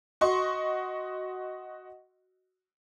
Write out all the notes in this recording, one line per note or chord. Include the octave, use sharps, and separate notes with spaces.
F#4 D#5 C6 C#6